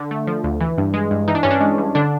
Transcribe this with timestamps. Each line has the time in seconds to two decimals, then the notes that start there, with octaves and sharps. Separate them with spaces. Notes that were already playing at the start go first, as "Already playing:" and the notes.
Already playing: D3
0.11 A3
0.27 F3
0.44 D2
0.60 E3
0.78 G2
0.94 G#3
1.11 G2
1.28 E3 D#4
1.35 D4
1.43 G2 C#4
1.51 D4
1.61 G#3
1.78 G2
1.95 D3 D4